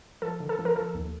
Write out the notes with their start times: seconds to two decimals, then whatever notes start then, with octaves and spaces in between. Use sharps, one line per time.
0.22 F3 A4
0.40 D3
0.49 A4
0.59 F3
0.65 A#4
0.76 F3 A4
0.94 D#2